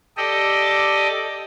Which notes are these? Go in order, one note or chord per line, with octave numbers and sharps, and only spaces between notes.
G4 A4 D5 D#5